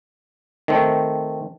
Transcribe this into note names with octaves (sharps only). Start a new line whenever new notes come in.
D#3 A3 C4